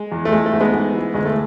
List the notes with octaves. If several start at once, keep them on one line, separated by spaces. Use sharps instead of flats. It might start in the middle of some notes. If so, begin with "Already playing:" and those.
Already playing: G#3
E2
A3
E3 G#3
A3
G#2
G#3 B3
G#2
E3
D2 G#3
A3